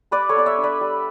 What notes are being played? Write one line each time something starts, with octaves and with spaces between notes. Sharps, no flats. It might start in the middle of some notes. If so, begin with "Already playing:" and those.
G3 B4 D5
A4 C#5
B3 D5
C#5 E5
D4
B4 D5
G3